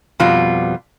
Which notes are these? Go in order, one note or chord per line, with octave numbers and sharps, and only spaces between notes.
F2 B2 G3 F4